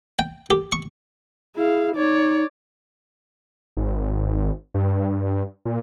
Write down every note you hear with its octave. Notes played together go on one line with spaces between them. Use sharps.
G5
G4
C#6
E4 G#4 F5
D#4 C#5 D5
G#1
G2
A#2